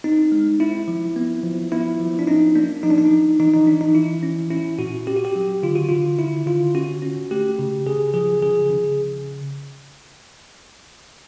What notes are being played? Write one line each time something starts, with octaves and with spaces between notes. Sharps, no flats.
C4 D#4
G#3
C4 E4
F3
B3
F3
B3 E4
F3
D4
C#4 D#4
A#3 D4
F3 D#4
D4
D#4
F3
E3 D#4
D#4
E3 D4
D#4
E3 E4
C#4
C#4 E4
A#2 F#4
C#4 G4
F#4
G4
F#3
D3 F4
F#4
D3 F4
D3 E4
D3 F4
C#4 F#4
C#4
A3 G4
C#3
C#3 G#4
F3 G#4
C#3 G#4
C#3